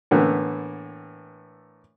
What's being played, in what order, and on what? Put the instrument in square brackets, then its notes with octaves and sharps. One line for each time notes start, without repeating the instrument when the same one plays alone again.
[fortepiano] A2 D3 E3 A#3 B3